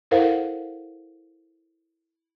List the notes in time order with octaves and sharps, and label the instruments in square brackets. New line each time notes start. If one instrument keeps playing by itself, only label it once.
[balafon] E4 A4 A#4 C5 F5 F#5